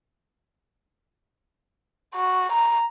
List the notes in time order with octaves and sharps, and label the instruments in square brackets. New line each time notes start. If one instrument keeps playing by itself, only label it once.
[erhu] F#4
A#5